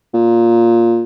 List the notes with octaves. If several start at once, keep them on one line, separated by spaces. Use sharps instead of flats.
A#2